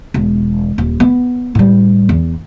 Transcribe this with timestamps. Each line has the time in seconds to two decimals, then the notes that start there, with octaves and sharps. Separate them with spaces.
0.14 E1
0.78 D#1
1.00 B3
1.55 A2 G3
2.09 E2